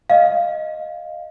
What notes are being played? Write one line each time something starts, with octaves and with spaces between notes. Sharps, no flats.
D#5 F5